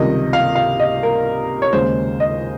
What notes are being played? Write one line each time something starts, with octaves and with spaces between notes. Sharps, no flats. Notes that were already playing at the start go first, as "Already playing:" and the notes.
Already playing: C#2 C3 D#3 G3 D#5
F5
F5
D#5
A#4
C#5
D#2 C#3 G#3 C5
D#5